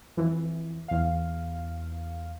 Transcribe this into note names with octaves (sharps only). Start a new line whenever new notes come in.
F2 E3
E2 F5